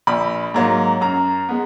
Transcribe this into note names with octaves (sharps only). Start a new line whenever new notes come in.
A#1 B5
G#2 F#3 A#3
F#2 A#5
G#3 B3